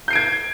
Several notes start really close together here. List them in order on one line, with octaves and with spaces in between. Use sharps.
G6 C7 D7 G#6